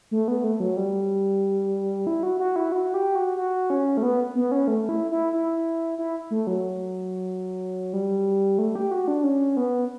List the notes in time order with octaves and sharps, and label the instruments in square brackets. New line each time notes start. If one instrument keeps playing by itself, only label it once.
[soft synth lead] A3
B3
A3
F#3
G3
E4
F#4
F#4
E4
F#4
G4
F#4
F#4
C#4
A3
B3
B3
C#4
A3
E4
E4
E4
E4
A3
F#3
G3
A3
G4
F#4
D4
C#4
B3